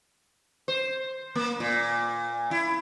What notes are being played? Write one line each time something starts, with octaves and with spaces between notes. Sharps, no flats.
C5
A#3
A#2
E4